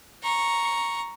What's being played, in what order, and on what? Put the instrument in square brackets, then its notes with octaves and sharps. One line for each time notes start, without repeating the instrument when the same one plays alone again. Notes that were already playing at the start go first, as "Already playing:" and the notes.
[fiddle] A#5 C#6